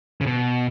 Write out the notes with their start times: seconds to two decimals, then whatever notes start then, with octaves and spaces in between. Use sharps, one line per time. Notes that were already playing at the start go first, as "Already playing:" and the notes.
0.21 C#3
0.26 B2